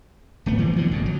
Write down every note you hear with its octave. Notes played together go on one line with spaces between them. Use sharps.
D1 A3 B3
E3 F3 A#3 C4
F2 B2 D3
G1 C#2 A2
F#3